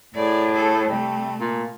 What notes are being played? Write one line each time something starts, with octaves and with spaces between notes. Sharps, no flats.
A2 G#4 D5
G#4 A4
C3 G3 A3
A#2